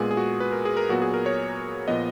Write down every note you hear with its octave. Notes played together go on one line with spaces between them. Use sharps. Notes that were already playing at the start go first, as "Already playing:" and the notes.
Already playing: A#2 G#3 B3 G#4
G#4
F#4
B4
A#4
G#4
A#4
A#2 F#3 B3 F#4
G#4
A#4
C#5
A#2 F3 B3 D#5